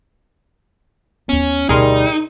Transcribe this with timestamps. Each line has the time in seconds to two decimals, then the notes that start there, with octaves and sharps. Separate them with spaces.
1.29 D#2 B3 C#4
1.69 D2 B2 G3 D#4 G#4 A#4 C6